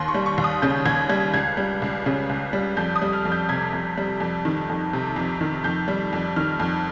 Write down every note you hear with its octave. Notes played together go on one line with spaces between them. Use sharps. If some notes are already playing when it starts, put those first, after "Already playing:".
Already playing: D#2 C6
C#6
G3
C#6
D#2
D#6
C#3 G6
D#2 G#6
G3 G#6
C#2 G#6
G3
C#2
C#3
C#2
G3
F2 G6
D#6
G3
F6
F2
G6
C3 G#6
F2
G3
F2
D#3
F2
C3
F2
D#3
F2 G6
G3
F2
D#3 F6
F2